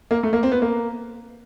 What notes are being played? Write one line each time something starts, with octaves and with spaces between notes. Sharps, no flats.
A#3
A3
A#3
C4
B3
A#3